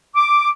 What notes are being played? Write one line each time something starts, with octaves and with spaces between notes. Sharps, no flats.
D6